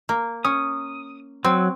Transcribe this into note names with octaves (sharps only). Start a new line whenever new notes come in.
A#3
C#4 D#6
F#3 C4